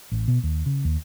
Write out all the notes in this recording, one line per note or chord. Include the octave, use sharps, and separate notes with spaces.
A1
B2
D#2
C#3
D#2